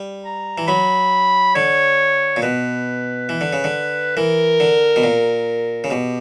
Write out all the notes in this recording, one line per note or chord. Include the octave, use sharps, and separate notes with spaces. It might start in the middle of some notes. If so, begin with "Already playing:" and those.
Already playing: G3
A#5
E3
F#3 B5
D3 C#5
A#2
B2 B4
E3
D3
C#3
D3
E3 A#4
D3
B2
A#2
C#3
B2 G4